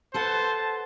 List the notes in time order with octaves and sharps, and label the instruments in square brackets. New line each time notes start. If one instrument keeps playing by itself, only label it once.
[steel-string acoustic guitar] A4 B4 F#5 [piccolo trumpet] C5 [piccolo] A5